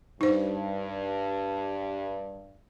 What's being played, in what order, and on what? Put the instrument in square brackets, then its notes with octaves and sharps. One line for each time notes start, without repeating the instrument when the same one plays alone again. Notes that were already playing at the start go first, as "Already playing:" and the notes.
[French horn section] G2 [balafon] D#4 C5